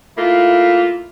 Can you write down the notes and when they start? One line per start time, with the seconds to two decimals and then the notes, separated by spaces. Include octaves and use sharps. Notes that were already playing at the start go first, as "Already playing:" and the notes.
0.16 A3 A#3 E4 F4